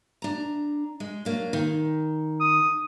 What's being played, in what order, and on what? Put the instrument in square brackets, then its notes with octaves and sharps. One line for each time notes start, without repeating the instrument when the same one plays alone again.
[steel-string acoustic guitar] D4 A#5
G#3
F#3 A#3 D4
D#3
[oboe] D#6